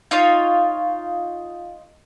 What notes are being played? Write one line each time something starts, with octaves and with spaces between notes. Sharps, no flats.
D#4 F4 C#5 F5